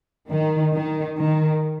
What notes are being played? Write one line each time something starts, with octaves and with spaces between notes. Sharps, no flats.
D#3
D#3
D#3